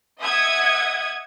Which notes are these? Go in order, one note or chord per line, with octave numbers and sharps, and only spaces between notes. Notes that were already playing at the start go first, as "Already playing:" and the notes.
D#5 E5 F#5 D#6 G#6